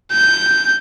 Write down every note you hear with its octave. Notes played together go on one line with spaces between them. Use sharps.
G6